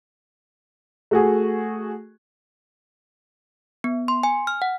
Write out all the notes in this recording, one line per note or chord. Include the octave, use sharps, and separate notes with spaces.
A3 F#4 G#4
B3
C6
G#5
F6
F#5